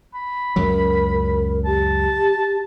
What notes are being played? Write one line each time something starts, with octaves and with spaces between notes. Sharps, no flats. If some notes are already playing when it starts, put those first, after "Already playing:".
B5
C#2 F#2 F#3 A#4
G4 A5